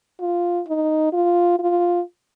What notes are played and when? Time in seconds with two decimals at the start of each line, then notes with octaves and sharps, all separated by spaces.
0.21 F4
0.67 D#4
1.13 F4
1.59 F4